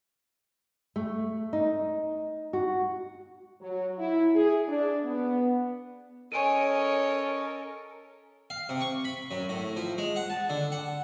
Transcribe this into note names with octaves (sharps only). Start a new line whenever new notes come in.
A3
D#4
F#4
F#3
E4
G#4
D4
B3
C#4 A4 A#4 C#5 D#5 G#5 D7 D#7
F5
C3
C#6
B5
F#2
A2
F3
G#3
F#5
A5
D3
F#5